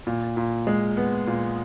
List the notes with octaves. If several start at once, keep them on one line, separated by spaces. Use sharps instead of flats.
A#2
A#2
G#3
B3
A#2